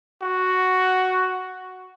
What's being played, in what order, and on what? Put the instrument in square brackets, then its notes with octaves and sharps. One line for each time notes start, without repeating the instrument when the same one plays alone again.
[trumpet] F#4